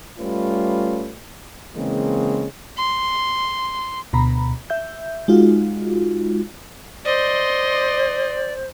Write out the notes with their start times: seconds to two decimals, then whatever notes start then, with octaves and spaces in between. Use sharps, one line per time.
0.19 G3 A3 C#4 F4 B4
1.76 C#3 E3 G#3 A#3 C4
2.77 C6
4.13 D2 B2 A#5 B5
4.70 E5 G6
5.28 G#3 D#4 F4 F#4
7.05 C5 D5 D#5 C6